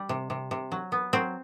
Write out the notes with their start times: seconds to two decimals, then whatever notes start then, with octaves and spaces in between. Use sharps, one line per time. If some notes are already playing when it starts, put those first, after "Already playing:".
Already playing: G3
0.09 C3
0.30 C3
0.51 C3
0.72 F#3
0.92 B3
1.13 F#3 C4